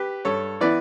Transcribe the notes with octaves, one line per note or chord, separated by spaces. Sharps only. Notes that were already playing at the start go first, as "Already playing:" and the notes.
Already playing: G4 B4
G2 A4 C#5
E3 B3 E4 B4 D5